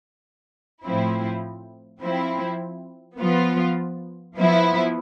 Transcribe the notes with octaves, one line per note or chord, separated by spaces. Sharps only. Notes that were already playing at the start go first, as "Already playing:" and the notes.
A2 F3 C4 E4
F3 C4 E4
F3 B3 F4
F3 B3 E4